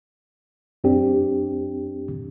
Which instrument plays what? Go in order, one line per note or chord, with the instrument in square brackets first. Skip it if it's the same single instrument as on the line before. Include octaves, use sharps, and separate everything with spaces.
[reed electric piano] F#2 C4 D4 G4